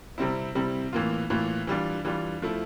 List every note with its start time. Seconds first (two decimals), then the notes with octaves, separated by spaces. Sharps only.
0.18 C3 G3 C4 E4
0.55 C3 G3 C4 E4
0.93 A2 E3 A#3 F4
1.30 A2 E3 A#3 F4
1.67 E3 G3 D4 F4
2.05 E3 G3 D4 F4
2.42 F3 A3 E4